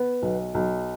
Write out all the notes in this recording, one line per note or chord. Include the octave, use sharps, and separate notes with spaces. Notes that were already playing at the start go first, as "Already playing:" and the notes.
Already playing: B3
B1
B1